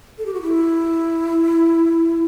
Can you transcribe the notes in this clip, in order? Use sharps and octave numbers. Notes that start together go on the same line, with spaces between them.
A4
G4
F#4
E4